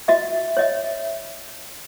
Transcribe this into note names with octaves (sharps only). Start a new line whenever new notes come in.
F#4 D#5 E5
C#5 D#5 E5